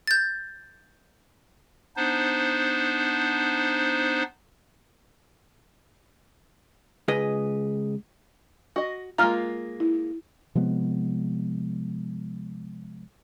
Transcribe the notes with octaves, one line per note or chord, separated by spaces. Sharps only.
G6 A6
B3 D4 D#4 C5
C#2 G#4 B4 D#5
F#4 D#5
G#3 A#3 F4 A#5 F6
E4
C3 F3 G#3 B3